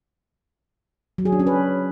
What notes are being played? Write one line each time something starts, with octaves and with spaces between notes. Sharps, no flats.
F#3
G#4
D4
C#4
B4